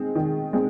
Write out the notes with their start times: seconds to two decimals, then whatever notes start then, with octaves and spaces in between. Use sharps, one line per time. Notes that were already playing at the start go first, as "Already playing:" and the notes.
Already playing: D#3 G#3 C4
0.15 D#3
0.53 G#3 C4